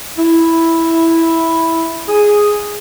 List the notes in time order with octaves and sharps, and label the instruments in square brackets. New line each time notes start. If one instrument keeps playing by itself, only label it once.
[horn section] E4
G#4